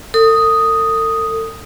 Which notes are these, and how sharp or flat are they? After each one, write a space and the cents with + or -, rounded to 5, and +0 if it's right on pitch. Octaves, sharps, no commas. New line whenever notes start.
A4 +40 D#6 +0